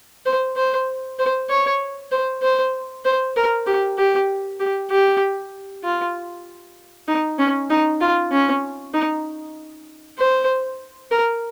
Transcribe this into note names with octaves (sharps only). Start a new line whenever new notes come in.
C5
C5
C5
C#5
C5
C5
C5
A#4
G4
G4
G4
G4
F4
D#4
C#4
D#4
F4
C#4
D#4
C5
A#4